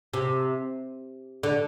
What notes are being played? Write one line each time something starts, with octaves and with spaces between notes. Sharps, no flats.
C3
D3